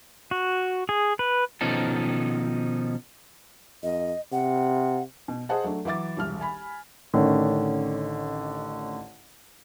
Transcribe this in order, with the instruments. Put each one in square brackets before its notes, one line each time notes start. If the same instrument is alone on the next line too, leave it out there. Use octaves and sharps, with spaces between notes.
[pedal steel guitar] F#4
G#4
B4
[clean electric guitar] B2 D#3 F3 C#4 D#4 A4
[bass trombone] F2 [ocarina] D#5
[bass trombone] C3 [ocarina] F#5
[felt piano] B2
G#4 C5 D#5 F#5 A5
F#3 A3 D4
E3 F#3 E5 D6 A6
E1 C2 F6
G#5 B5
[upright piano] A1 D3 D#3 C#4